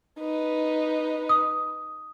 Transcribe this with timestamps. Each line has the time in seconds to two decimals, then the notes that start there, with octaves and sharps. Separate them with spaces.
0.20 D#4 B4
1.29 D#6